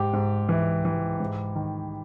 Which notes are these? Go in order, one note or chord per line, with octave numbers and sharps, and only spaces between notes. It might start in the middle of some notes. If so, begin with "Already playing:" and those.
Already playing: G#2 G4
G#2
E3
E3
G#2
D#3